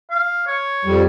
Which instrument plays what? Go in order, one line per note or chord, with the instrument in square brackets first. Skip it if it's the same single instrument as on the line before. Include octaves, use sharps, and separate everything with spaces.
[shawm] F5
C#5
[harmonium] F2 G3